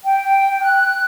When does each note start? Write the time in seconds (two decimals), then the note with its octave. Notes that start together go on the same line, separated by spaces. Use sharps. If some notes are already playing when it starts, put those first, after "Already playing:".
0.05 G5
0.62 F#6